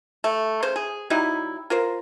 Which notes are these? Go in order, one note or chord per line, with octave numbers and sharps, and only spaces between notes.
A3
C#3 C5
G#4
F#3 G3 D#4 E4
F4 A#4 C5